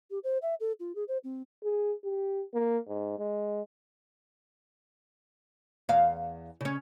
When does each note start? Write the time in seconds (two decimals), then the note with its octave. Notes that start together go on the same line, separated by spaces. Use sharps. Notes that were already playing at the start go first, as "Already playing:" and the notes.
0.11 G4
0.24 C5
0.42 E5
0.60 A4
0.80 F4
0.95 G#4
1.08 C5
1.24 C4
1.64 G#4
2.04 G4
2.54 A#3
2.87 G#2
3.18 G#3
5.89 E2 F5
6.61 C#3 C#4